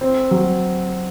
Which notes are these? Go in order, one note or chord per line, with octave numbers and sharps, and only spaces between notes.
C4
F#3